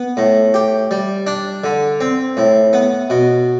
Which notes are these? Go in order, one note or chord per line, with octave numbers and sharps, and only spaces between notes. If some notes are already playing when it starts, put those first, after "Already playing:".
Already playing: B3
A2
G4
G3
D4
D3
C4
A2
B3
B2